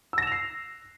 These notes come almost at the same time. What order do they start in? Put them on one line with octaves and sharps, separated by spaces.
E6 A#6 E7 F7 C7